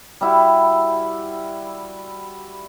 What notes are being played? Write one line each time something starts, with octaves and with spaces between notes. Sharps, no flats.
G3 E4 F#4